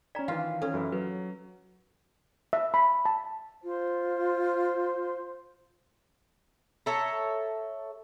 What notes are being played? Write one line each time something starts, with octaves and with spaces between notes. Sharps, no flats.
C#4 D5 A#5 B6
D#3 E3 F4 F5
C#4 A4
F#2 E3 E4
F#3 B4
E5
B5
A5
F4 C5
A4 C#5 E5 A#5